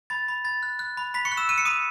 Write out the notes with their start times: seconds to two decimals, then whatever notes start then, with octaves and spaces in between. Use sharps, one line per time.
0.10 B5 A6
0.28 B5
0.45 B5 A6
0.63 F#6
0.79 F#6
0.97 B5
1.14 B5 B6
1.25 C#6 C#7
1.32 F#6
1.37 E6 E7
1.49 F#6 D#7
1.58 C#7
1.65 B5 D#6 D#7